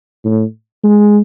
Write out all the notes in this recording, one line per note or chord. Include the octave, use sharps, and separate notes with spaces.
A2
G#3